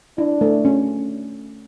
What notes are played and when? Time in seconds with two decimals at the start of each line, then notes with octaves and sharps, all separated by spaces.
0.18 D4 E4
0.41 A3
0.65 C#4